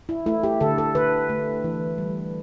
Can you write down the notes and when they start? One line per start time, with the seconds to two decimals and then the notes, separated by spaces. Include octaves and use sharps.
0.09 E4
0.26 A3 E4
0.43 G4
0.61 D3 A4
0.78 A4
0.95 D3 B4
1.29 A3
1.64 E3
1.98 G3